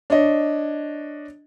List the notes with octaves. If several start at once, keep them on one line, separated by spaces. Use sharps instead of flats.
D4 C#5 D#5